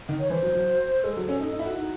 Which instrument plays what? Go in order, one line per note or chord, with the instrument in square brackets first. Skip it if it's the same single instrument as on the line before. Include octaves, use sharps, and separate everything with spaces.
[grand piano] D#3
[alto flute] C#5
[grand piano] E3 [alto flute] C5
[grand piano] F#3
F#3
[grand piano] G#3 [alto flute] A4
[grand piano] F#3
C#4
D#4
D#4
E4
F#4
[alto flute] D#4